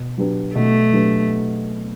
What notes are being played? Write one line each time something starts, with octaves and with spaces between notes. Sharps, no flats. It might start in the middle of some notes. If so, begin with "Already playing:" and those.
Already playing: B2
F#3 B3 D4 G4
B2 A3
F#3 B3 D4 G4